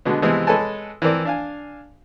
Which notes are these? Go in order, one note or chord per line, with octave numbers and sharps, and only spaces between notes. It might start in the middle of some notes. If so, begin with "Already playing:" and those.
B2 D3 G#3 B3
C3 E3 F3 G#3 B3 C4
G#3 A4 B4 C#5 G#5 A5
E3 F3 C4 A#4 D5
D4 F5 G#5